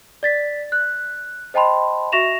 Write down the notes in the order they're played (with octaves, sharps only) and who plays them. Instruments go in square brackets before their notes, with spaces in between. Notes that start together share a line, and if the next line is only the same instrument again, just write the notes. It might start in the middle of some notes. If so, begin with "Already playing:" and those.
[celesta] D5 A6 B6
F#6
C5 D#5 G5 A5 B5 C6
F#4 E5 C#6 A#6 E7 F7